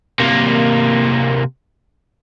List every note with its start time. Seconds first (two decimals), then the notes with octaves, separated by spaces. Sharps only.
0.20 C3 A#3